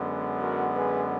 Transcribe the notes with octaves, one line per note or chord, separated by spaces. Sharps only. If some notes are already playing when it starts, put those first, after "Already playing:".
Already playing: F#2 D3 G#3 B3
F#4 A#4
G#4 B4